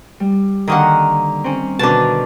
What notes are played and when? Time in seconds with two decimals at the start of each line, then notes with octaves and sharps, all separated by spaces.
0.20 G3
0.68 D3 D#3 A#3 F#5 D#6
1.44 C4 C#4
1.79 B2 D3 D#3 D4 A5